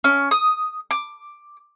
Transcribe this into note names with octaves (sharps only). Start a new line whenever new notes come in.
C#4
D#6
D6